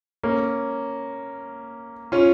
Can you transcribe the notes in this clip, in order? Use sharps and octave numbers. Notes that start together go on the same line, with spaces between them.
A#3 C#4
C#4 F4